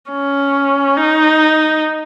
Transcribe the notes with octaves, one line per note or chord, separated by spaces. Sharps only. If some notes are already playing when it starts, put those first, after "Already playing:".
C#4
D#4